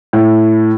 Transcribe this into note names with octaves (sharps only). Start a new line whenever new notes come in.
A2